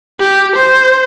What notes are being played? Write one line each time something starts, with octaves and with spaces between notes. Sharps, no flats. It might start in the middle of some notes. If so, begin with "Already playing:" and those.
G4
C5